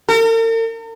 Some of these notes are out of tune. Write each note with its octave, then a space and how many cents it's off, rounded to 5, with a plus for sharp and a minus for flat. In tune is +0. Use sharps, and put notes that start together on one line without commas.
A#4 -45